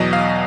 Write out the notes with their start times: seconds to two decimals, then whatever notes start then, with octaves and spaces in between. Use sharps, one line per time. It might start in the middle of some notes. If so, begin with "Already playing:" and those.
Already playing: E2 B2 F#3 D#5
0.13 F5